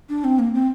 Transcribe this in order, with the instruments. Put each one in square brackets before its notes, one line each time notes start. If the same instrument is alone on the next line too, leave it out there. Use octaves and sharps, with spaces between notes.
[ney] D4
C4
A#3
C4